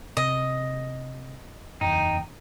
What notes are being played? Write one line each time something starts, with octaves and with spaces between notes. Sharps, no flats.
C3 D#5
F#1 E2 D#4 G5